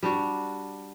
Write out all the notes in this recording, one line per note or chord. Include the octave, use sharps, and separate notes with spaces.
G3 D4 F#4